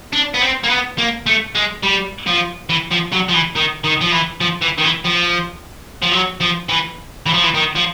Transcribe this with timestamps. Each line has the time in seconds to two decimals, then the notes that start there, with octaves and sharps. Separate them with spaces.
0.13 D4
0.34 B3
0.42 C4
0.64 A#3
0.70 B3
0.98 A#3
1.26 A3
1.55 G#3
1.83 G3
2.27 F3
2.69 E3
2.91 F3
3.12 F#3
3.28 F3
3.34 E3
3.56 D#3
3.84 D#3
4.01 F3
4.12 E3
4.41 F3
4.62 E3
4.78 D#3
4.83 E3
5.04 F3
6.02 F3
6.12 F#3
6.41 F3
6.69 E3
7.26 E3
7.34 F3
7.43 E3
7.54 D#3
7.75 F3